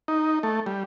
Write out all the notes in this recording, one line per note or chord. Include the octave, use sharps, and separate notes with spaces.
D#4
A3
G3